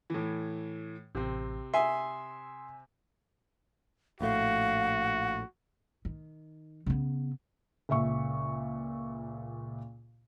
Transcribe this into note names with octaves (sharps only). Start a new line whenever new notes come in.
A2 E3
A1 C3 C4
E5 G#5 C6 D#6
A#1 A2 A3 F#4 F5
D#3
C#3 B3
C#2 A#2 E5 C#6